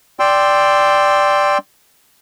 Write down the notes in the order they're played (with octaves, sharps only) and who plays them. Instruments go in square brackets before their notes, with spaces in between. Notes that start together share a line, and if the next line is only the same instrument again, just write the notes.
[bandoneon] D5 G5 C6 E6